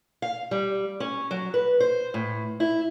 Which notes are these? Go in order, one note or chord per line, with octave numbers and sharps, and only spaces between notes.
F5
G3
C#4
F#3
B4
C5
A2
E4